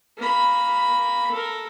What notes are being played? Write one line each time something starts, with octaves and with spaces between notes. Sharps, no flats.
A#3 B5
A4 A#4